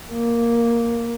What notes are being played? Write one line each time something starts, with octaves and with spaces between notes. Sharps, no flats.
A#3